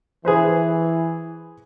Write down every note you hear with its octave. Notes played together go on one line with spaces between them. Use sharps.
E3 G#4 B4 C5